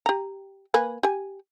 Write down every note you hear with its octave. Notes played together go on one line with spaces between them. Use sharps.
G4 A#5
A#3 B4 G#5
G4 G#5